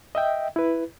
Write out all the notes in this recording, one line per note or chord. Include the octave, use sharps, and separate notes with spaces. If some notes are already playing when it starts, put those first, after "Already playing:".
D#5 E5 G5
E4 B4